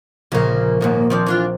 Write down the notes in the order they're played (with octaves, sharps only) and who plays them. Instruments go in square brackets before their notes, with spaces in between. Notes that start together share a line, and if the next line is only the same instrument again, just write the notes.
[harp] A#1 A#2 [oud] C#3 A#3
[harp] A#1 [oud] D#2 G#2 A#3
[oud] D#3 F3 D5 [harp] C4
[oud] E3 D4 F4